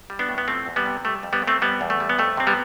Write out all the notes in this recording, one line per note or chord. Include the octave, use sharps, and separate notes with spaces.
G3
B3 D4
A2
B3
F3 A3 C4
E2
G3 B3
C3
G3 A3
F2
G3 B3
F2
A3 C4
G3 B3
E2
A3
G3
B3
F2 A3
C3 C4
G3 B3